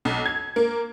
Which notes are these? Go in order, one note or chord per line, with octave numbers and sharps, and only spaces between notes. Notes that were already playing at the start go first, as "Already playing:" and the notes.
B1
G#6
A#3